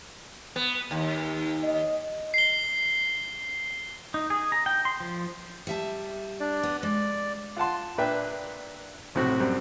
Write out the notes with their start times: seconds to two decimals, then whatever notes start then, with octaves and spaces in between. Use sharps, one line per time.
0.56 B3
0.91 D#2
1.64 D#5
2.34 C7 G7
4.14 D#4
4.30 G#4
4.52 A#5
4.66 G5
4.85 C6
5.00 F3
5.67 G3 E5 A5
6.40 D4 D5
6.63 B3
6.83 G#3 D5
7.57 F4 F#5 A5 C6
7.98 A#2 D4 B4 E5 G5
9.15 B1 A2 C3 C4 F#4
9.40 F#2 G3 C4